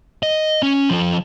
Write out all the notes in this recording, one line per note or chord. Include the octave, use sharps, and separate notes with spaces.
D#5
C#4
F3 A4